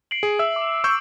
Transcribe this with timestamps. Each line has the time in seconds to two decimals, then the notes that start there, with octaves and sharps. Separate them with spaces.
0.11 C7 D7 F#7
0.23 G#4
0.39 E5 E6
0.56 D6
0.84 C#6 E6 G6